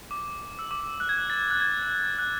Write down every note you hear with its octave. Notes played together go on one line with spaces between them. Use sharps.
D6
E6
D6
F#6
G#6
F#6
A6
F#6
G#6
F#6